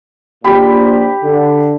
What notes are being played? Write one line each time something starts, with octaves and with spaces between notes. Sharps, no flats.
A#1 A#2 G4 B5
D3